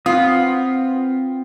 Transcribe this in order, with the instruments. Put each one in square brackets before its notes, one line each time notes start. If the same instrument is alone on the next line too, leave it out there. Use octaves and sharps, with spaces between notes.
[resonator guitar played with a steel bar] B3 F4 [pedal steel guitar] C4 D#6